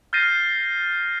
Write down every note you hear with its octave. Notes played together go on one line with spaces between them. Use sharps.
F6 G6 A6 A#6 C7 D#7